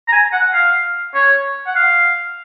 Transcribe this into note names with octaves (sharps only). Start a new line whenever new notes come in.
A#5
G#5
F#5
F5
C#5
F#5
F5